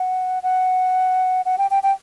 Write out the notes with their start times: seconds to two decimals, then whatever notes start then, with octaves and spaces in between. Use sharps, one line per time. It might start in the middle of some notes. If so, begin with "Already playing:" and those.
Already playing: F#5
0.43 F#5
1.46 F#5
1.58 G5
1.71 G5
1.83 G5